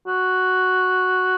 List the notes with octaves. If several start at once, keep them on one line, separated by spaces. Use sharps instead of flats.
F#4